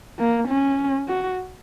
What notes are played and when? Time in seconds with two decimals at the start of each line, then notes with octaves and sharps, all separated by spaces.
0.19 A#3
0.48 C#4
1.08 F#4